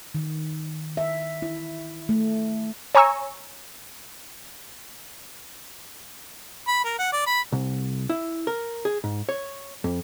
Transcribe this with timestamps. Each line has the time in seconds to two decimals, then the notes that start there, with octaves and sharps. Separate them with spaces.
0.15 D#3
0.97 E5
1.42 E4
2.09 A3
2.95 C#5 G#5 A#5 C#6 E6
6.68 B5
6.84 A#4
6.99 F#5
7.12 D5
7.26 B5
7.52 C2
8.10 E4
8.47 A#4
8.85 G#4
9.04 G#2
9.29 C#5
9.84 F2